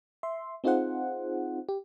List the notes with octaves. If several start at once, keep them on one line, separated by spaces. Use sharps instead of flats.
E5 C6
C4 D#4 F4 G#4 C5 F#5
G4